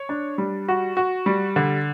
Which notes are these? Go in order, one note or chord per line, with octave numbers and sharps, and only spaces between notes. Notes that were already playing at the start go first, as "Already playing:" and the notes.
Already playing: C#5
D4
G3
F#4
F#4
G3
D3